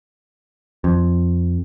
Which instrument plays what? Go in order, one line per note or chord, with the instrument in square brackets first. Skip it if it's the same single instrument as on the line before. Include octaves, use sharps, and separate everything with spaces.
[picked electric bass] F2